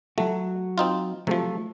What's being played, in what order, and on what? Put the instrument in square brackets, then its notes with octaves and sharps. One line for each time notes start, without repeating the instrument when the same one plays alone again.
[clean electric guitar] F#3 F#4 [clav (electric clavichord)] A3
[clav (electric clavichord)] C4 D#4 F4
[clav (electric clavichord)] C3 F3 [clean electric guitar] F#3 A3 A4